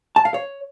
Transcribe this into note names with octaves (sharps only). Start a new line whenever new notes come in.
A5
F5
C#5